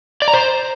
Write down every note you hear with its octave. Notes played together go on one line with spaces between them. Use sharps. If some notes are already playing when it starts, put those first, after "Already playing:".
D5
A#5
C5